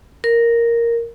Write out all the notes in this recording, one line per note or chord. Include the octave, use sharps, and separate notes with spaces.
A#4